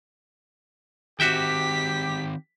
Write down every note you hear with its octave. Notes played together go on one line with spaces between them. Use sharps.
D#3 C4 F#4 G4 E5 G5 B6